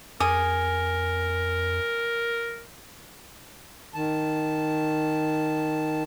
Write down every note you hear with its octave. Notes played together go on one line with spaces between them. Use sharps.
F2 G#4 A#4 D#6
D#3 A5